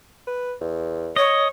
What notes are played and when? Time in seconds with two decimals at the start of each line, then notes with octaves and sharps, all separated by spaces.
0.27 B4
0.61 E2
1.16 C#5 D#5